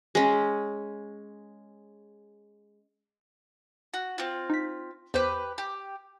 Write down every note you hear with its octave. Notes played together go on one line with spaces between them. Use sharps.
G#3 C#4
F#4
C4 F4
D#4 B6
E2 G4 B4 C5 G6
G4